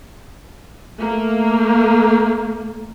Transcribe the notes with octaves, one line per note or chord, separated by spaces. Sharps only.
A3 A#3